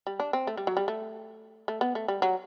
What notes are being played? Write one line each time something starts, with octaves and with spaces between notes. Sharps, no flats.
G3
D4
C4
A3
G3
F#3
G3
A3
A3
B3
A3
G3
F#3